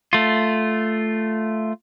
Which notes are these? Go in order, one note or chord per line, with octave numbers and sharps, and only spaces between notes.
A3 F4